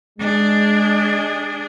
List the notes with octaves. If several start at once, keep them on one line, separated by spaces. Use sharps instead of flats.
G#3 D4 G#4